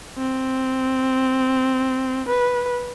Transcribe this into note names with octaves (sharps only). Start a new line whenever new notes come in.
C4
B4